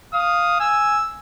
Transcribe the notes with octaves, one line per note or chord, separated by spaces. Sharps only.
F5 D#6
G#5 E6